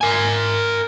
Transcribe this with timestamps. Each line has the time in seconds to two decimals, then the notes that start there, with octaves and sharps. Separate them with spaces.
0.01 A#4 G#5